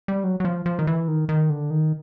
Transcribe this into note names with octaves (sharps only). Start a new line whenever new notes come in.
G3
F#3
F#3
F3
F3
D#3
E3
D#3
D#3
D3
D#3